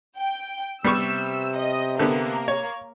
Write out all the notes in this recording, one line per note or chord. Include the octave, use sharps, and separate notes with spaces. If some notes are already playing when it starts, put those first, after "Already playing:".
G5
C3 G3 B3 C#6 E6
D#5
D3 A#3 B3
C#5